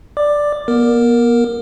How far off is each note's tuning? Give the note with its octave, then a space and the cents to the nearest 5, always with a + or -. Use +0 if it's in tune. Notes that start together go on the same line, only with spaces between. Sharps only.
D5 +0 D6 +15
B3 -40 A#4 +0